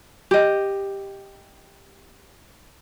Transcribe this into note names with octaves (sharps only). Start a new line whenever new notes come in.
G4 D#5